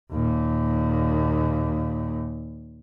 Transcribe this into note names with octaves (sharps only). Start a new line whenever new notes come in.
D#2 A#2